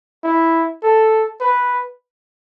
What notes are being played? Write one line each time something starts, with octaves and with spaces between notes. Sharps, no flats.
E4
A4
B4